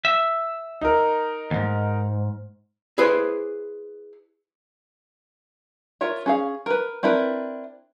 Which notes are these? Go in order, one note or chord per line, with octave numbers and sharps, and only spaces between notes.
E5
D#4 A#4
D#2 G#2
E4 G#4 B4 C5
F4 A#4 C#5 E5
C#4 G#4 F5
A#4 B4
C4 D4 E4 A#4 B4